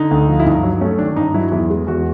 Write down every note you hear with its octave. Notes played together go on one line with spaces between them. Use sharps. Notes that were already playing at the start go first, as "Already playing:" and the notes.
Already playing: D3 D#4
D2
F3
E4
G2 D#4
F#3
A3 C#4
D#3 D4
G2 D#4
F#3 E4
E2 E4
G#3
E2 F#4